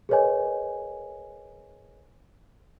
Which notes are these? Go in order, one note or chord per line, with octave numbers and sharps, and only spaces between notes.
G#4 A#4 B4 C#5 D#5 G#5